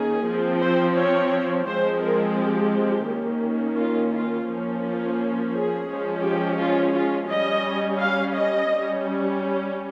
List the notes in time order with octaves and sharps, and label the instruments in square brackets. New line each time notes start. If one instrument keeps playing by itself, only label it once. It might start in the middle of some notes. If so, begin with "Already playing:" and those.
Already playing: [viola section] D#3 A#3 C#4 G#4
F3 C4
C5
C#5
F3 G#3 C4 C5
A#4
G4
D#3 A#3 C#4
F4
F4
F3 A#3 C#4
F4
G#4
F3 G#3 C#4
G4
F4
F4
G3 C#4 D#5
F5
D#5
G3 C#4